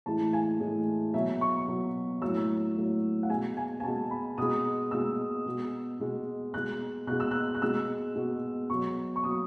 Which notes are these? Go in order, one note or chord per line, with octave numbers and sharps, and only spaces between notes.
A2 E3 G#3 A5
G#5
A2 E3 G#3
B2 F#3 E5
C#6
B2 F#3
A2 F#3 E6
A2 F#3
F#5
B2 G#3 G#5
G#5
G#5
B2 G#3 A5
B5
B2 G#3 D#6
B2 G#3 E6
B2 G#3
B2 G#3
B2 G#3 F#6
B2 G#3 F#6
E6
F#6
F#6
B2 G#3 E6
B2 G#3
B2 F#3 C#6
C#6
B2 F#3 D#6